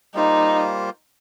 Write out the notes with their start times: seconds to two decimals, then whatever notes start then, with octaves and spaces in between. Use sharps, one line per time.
0.14 G3 A#3 D#4 F4 C5